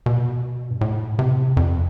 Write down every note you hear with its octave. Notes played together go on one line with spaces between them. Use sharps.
B2
G2
A2
C3
F2